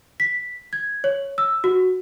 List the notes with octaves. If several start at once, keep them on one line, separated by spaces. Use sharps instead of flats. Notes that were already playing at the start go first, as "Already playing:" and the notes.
B6
G#6
C#5
E6
F#4